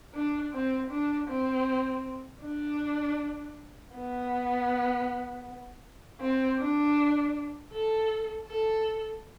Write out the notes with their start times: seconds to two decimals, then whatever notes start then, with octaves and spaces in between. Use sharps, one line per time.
0.14 D4
0.53 C4
0.91 D4
1.28 C4
2.41 D4
3.94 B3
6.21 C4
6.59 D4
7.73 A4
8.47 A4